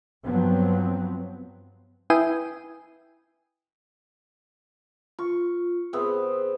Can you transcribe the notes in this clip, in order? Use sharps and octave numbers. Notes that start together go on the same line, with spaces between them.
G2 F3 F#3 B3 C4
E4 B4 E5 G5 G#5 D#6
F4 C#6
C3 B3 C4 G#4